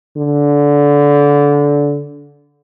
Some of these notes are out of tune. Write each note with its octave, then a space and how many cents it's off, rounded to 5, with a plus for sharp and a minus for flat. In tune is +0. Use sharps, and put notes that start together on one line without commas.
D3 -20